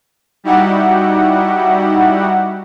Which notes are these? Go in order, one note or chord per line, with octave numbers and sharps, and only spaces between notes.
G3 D#4 E4 F#4 G4 F#5